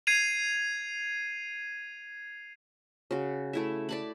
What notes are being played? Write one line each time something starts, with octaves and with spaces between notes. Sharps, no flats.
G#6 C7 D#7 F7
C#3 F#4
A3 E4 E5
D5 A5 B5